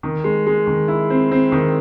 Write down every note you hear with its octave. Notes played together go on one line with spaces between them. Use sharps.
D#3
G#3
G#3
D#3
E4
C4
C4
D#3